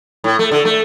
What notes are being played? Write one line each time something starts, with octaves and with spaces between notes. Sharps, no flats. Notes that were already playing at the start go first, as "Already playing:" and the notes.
A2
A3
D3
A3